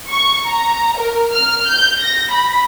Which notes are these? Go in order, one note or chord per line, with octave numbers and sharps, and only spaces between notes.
C#6
A#5
A#4
F6
G6
A#6
B5